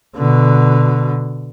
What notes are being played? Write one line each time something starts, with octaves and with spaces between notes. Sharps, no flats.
B2 D3